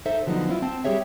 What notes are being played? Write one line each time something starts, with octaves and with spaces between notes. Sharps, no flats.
D#4 A4 C5 E5
F2 D3 F3 F#3 B3 D#4
C4 E4 F4
C4 A5
G3 G4 G#4 C#5 E5